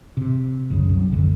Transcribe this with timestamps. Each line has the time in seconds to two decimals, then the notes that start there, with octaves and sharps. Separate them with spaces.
0.17 C3
0.70 F#1 C2 F#2 C#3
0.89 C2 F#3
1.12 F1 F#2 D3